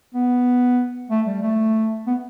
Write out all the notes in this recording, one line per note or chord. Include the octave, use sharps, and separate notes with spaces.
B3
A3
G3
A3
B3